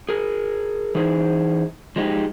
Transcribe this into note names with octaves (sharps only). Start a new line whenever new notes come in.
G#4 A#4
E3 D#4 G#4 C5
F3 G#3 D#4 F4 G4